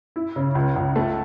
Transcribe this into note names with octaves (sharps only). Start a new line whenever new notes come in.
E4
C#3
C#2
C#2
A3